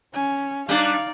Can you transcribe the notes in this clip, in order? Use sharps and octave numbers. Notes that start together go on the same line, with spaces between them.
C#4 G#5
G3 D4 D#4 D5 F5